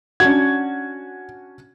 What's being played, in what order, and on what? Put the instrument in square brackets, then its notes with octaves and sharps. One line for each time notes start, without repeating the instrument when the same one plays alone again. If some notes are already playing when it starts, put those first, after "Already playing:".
[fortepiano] C#4 D4 F#4 [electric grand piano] G#6